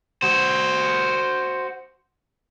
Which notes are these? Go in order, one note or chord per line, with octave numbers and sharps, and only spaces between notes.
F#4 C5